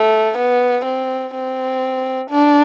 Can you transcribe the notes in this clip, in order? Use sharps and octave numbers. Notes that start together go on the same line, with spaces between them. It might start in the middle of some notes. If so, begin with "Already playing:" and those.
Already playing: A3
B3
C4
C4
D4